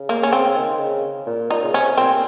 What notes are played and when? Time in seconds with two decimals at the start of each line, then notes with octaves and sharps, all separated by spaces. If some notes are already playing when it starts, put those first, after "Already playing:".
Already playing: C#3
0.09 A#3
0.23 C#4
0.33 C4
0.57 D#3
0.80 C#3
1.26 A#2
1.50 A#2 D#4
1.63 C#3
1.74 C3 C#4
1.97 A#2 C4